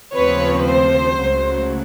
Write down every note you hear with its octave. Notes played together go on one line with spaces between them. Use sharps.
D#2 C#3 F3 A3 C4 B4 C#5
C5
C#2 C#3 F#3 A3